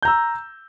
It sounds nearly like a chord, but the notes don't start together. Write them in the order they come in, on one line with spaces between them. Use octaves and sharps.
G6 A#5 E6